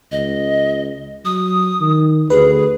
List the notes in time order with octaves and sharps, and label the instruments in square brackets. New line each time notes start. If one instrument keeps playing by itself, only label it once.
[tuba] C#2 [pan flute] D#5
[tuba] F#3 [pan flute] D#6
[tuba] D#3
[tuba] D2 [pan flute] G#4 [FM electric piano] B4